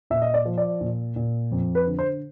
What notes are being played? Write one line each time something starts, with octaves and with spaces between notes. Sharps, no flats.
A#2 E5
D#5
D5
F3
D5
A#2
A#2
F2
B4
D3
C5